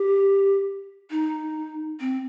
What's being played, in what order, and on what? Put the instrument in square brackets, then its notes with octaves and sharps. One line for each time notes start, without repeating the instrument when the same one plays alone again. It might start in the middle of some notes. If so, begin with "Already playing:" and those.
Already playing: [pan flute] G4
D#4
C4